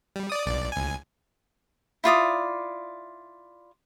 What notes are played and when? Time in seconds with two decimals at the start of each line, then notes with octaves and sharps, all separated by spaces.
0.16 G3
0.30 D5 D#6
0.46 B1 D5
0.72 C#2 G#5
2.04 E4 F4 D5 D#6